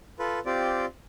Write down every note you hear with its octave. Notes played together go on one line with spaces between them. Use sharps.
F4 A4 B4
C4 F4 G4 D5